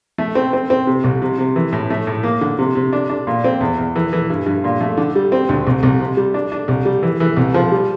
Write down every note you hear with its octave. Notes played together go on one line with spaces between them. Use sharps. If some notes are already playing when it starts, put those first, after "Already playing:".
A3
C4
C4
C4
C3
C2
C3
C3
E3
A2
A3
A2
A#3
D3
C3
C3
D4
D4
A#2
C4
E2
E2
E3
E3
G2
G2
A#2
A3
D3
G3
C4
D2
C2
C2
C3
G3
D4
D4
C2
G3
E3
E3
C2
F3
G3